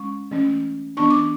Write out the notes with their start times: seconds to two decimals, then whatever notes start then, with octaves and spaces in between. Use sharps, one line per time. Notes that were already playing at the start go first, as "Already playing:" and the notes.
Already playing: G#3 C#4 C#6
0.31 E3 A3 C#4
0.97 E3 B3 D4 C#6
1.10 D6